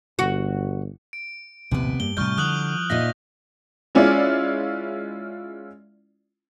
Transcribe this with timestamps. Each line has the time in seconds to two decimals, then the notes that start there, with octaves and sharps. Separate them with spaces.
0.19 G1 F#4
1.13 D7
1.71 A#1 D#2 A2 C3 B3
2.00 G2 A#3 G7
2.17 A2 C3 G3 C#6 F6 G6
2.38 D3 F3 D#6 F#6 F#7
2.90 A#2 D#4 E5 A#6
3.95 G#3 C#4 E4 F4 D5